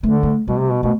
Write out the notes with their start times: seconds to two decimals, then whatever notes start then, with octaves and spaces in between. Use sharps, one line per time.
0.03 D3 A3
0.23 A3
0.48 B2 G3
0.60 C3
0.72 B2
0.83 B2 A3